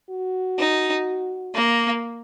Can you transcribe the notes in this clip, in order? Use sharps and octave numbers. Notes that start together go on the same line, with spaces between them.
F#4
D#4
A#3